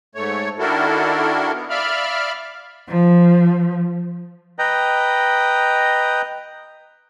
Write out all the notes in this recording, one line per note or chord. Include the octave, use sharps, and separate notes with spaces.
G#2 A3 C#5
D#3 D4 E4 F#4 A4 A#4
B3
D5 E5 F5 B5 F6
F3
B4 D#5 G5 A#5